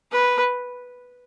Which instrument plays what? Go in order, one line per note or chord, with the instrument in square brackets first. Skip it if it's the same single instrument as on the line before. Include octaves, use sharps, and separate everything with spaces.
[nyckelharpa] B4